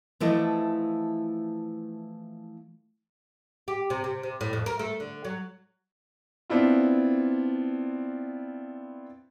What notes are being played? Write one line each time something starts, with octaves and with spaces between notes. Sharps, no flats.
E3 F3 A3 E4 D#5
G4
C3
C3
C3
A2
F2
A#4
A3
D3
F#3
B3 C4 D4 E4 F4